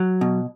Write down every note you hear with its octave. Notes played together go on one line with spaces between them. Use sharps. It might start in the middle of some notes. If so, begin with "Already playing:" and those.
Already playing: F#3
B2